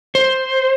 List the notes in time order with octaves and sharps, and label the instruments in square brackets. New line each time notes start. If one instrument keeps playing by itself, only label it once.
[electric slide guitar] C5